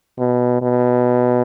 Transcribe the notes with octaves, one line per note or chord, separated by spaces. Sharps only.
B2
B2